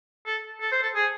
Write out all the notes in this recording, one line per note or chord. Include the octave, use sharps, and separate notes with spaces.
A4
A4
C5
A4
G#4